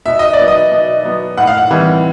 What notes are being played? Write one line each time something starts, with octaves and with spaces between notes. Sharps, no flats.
B2 E5
D#5
D5
F#3 B3
D#5
B2
F#3 B3
A2 F#5
F5
F#5
E3 G3 C4